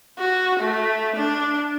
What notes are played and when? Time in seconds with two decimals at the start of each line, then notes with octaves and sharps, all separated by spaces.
0.19 F#4
0.59 A3
1.16 D4